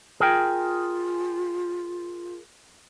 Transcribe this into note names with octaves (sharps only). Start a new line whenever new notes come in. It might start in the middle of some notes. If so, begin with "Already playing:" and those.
F4 G#4 A#4 G5